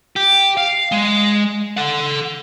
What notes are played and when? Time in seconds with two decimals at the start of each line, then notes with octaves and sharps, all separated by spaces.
0.16 G4
0.57 F5
0.92 G#3
1.77 A4 F#5